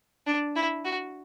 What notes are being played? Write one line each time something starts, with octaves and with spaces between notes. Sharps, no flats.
D4
E4
F#4